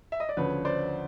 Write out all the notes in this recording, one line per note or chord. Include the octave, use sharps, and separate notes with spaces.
E5
D#5
D5
D2 C#3 F3 B4 C#5
C5 D5